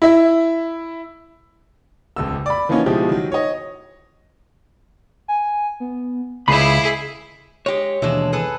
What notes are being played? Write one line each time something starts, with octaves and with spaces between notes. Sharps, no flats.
E4 E5
D#1 C#2 E6
D5 B5
E3 F3 A#3 B3 C#4 D#4
B2 F3 G#3 E4 G4
D#3 F#3
C#5 D#5
G#5
B3
C#2 E4 G#4 B5 C7
G#3 G4 C#5
D#2 B2 E3 G#3 D4 E4
G#4 A4 B4